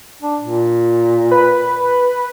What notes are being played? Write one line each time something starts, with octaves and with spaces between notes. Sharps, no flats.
D4
A#2
B4